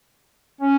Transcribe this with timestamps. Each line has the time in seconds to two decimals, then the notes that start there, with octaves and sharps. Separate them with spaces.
0.61 C#4